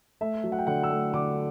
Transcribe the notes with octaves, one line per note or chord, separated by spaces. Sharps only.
A3 E5
F#3
F#5
G5
D3 F#5
E6
A3
D3 D6